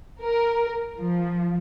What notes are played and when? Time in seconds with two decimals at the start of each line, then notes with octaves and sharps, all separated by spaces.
0.22 A#4
0.98 F3